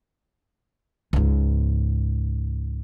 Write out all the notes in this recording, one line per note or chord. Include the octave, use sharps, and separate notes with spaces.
C#2 G#2